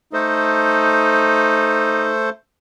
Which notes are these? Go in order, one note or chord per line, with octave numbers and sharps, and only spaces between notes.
A3 D#4 A4 C5